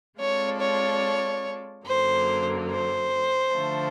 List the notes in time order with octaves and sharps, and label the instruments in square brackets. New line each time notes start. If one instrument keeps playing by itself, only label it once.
[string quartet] G#3 C4 F4 A4 D5 [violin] C#5
[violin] C#5
[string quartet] F#2 D3 F#3 A#3 [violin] C5
[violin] C5
[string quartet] D3 F3 A3